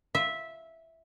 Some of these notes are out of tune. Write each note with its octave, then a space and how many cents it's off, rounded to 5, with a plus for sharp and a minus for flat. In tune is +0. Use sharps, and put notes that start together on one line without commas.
F4 -15 E5 -10